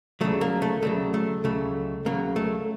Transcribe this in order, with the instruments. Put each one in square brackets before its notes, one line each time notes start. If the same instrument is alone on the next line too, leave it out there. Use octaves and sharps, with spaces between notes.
[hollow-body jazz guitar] D2 C#3 F#3 A3
A#3
A3
D2 C#3 F#3 A3
A3
C#2 C#3 F#3 A3
C#2 C#3 F#3 A#3
A3